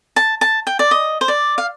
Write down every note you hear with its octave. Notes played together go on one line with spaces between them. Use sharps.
A5
A5
G5
D5
D#5
C5
D5
F5